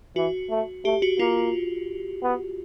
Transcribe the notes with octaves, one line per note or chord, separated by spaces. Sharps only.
E3 F#4
A3
A3 G4
F#4
A#3 F4
B3